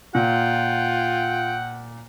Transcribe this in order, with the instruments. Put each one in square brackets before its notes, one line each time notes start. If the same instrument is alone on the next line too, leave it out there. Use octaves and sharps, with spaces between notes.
[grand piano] A#2 [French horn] F4 [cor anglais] F#5 [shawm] G5